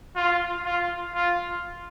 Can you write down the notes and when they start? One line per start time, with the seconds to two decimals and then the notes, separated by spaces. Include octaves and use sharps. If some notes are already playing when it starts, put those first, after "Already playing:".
0.16 F4
0.65 F4
1.15 F4